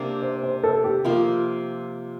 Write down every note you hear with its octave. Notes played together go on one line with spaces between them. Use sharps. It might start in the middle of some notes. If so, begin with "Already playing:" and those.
Already playing: C3 A#3 D4
C5
C5
A4
G4
C3 F3 A#3 F4